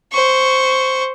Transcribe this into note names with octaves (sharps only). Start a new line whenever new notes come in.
C5 C#6